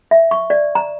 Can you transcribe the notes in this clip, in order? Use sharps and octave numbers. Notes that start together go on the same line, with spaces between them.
E5
C#6
D5
A#5